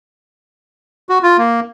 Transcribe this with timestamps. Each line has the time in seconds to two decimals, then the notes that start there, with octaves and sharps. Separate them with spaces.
1.09 F#4
1.23 F4
1.38 A#3